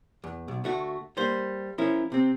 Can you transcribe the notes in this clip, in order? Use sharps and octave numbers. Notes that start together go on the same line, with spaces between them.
E2
B1
D2 A3 F#4
G3 A#3 C5
F3 C#4 E4 A#4
C3 C4